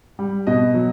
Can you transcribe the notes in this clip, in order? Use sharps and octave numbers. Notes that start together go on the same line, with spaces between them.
G3
B2 D#5
F#3